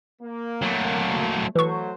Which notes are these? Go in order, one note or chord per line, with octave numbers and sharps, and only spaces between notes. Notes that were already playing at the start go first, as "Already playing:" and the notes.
A#3
F#3 A3
E3 F#3 A3 C5 C#6